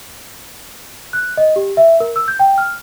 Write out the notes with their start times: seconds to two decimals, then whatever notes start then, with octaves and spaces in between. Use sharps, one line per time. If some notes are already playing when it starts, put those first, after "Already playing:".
1.13 F#6
1.37 D#5
1.56 G4
1.77 E5
2.00 A#4
2.16 E6
2.28 G6
2.39 G5
2.58 F6